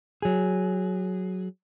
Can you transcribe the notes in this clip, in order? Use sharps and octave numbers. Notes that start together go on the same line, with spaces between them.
F#3 G#4